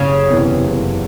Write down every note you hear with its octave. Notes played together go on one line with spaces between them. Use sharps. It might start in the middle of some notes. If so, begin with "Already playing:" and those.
Already playing: F#1 C#3
E2 C3 E3
F#1